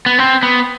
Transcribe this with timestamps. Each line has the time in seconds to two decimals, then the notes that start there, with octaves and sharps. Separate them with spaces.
0.06 B3
0.18 C4
0.43 B3